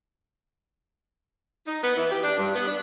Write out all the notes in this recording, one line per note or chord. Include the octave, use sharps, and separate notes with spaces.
D#4
B3
E3
G4
D4
G2
B3
D4